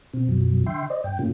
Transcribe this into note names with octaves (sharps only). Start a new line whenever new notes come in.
B2 C4
F#2 B2 F3 F#3
D3 E5 G5 C6
C5 D5 D#5
G2 G5
G#2 C3 A3 A#3 C#4 F4